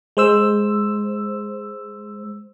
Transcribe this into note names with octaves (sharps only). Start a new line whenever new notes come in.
G#3 C5 E6